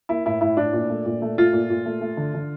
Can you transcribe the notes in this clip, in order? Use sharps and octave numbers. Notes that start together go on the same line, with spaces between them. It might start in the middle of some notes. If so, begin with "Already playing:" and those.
A#3 E4
A2 E4
A2 E4
A2 D4
A#2
A3
A#2
A3
A3 F4
A#2
A#2
A3
A3
D3
D3